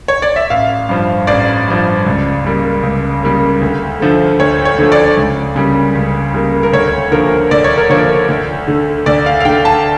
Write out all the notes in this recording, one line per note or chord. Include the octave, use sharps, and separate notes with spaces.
C#5
D5
E5
A1 F5
G2 F3
A1 D5
G2 F3
C#2
C#3 G3 A#3
C#2
C#3 G3 A#3
D2
D3 F3 A3
D2 C#5
C#5
D3 F3 A3
D5
C#2
C#3 G3 A#3
C#2
C#3 G3 A#3
A#4
D2 C#5
D3 F3 A#3 A#4
D2 D5
C#5
A#4
D3 F3 A#3 C#5
D2
D3 A3
D2 D5
F5
F5
D3 A3 G5
A5